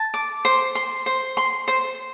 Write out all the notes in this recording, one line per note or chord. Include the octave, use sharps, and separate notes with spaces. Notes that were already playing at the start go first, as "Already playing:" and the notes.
Already playing: A5
D6
C5
C6
C5
C6
C5